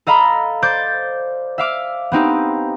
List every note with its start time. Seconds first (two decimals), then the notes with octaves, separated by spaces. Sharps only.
0.07 A4 D#5 F5 A#5 B5
0.62 C5 D5 D6 G6 A6
1.58 E5 F5 D6 F6
2.12 B3 C4 D#4 G4